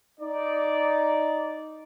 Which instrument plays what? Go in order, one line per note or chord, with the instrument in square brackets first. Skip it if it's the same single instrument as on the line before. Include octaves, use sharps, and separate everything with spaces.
[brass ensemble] D#4 D5